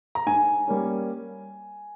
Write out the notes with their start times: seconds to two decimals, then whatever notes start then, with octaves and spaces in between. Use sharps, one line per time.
0.15 A#5
0.27 G#2 G#5
0.68 G3 A#3 C#4